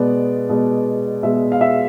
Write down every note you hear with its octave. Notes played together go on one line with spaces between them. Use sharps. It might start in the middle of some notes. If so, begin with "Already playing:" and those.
Already playing: B2 G#3 B3 D5
B2 G#3 B3
B2 G#3 B3 E5
F5
E5